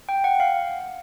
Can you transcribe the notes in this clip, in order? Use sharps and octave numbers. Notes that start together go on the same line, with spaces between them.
G5
F#5
F5